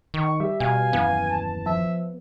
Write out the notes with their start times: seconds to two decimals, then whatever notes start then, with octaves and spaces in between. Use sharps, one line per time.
0.14 D#3 C#6
0.40 G3 E5
0.60 B2 F5 G#5
0.93 D#1 F#2 E3 B3
1.30 A5
1.66 F3 E5